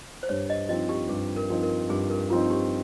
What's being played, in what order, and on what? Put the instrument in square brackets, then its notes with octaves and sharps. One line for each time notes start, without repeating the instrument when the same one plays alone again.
[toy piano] C5
[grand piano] G2 [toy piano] C#5
[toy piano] D#5
[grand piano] F3 C4 D#4 [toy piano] D#5
[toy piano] G4
[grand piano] G2 [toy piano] G#4
[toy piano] A#4
[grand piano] F3 C4 D#4
[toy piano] A#4
[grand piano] G2 [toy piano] G#4
[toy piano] A#4
[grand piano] F3 C4 D#4 [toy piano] F4
[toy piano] G4